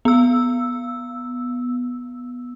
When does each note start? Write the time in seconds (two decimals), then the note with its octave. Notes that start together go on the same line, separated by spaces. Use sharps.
0.05 B3 E6